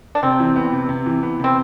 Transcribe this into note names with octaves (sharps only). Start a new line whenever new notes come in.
D4
C3 C4
E3
B3
C3
C3
E3
B3
C3 C4